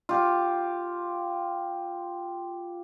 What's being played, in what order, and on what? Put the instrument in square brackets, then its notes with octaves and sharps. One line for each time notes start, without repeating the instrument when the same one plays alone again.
[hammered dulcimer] F4 G4